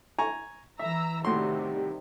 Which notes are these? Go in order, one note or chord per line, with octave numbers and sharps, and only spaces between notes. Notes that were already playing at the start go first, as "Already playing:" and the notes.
G#5 A#5 C#6
E3 E5 A#5 E6
A2 C3 D#3 G3 F#4 C6